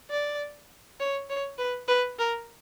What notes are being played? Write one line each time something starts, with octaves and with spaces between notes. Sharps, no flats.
D5
C#5
C#5
B4
B4
A#4